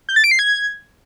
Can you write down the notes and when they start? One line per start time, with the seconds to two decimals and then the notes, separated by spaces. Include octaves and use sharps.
0.09 G6
0.16 A6
0.24 D7
0.31 C7
0.39 G#6